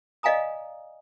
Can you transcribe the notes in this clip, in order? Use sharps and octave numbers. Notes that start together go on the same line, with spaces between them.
D5 D#5 F5 G#5 A#5 D#6